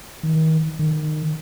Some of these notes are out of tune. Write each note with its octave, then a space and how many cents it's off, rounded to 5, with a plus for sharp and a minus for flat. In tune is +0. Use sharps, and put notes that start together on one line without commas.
D#3 +35
D#3 -20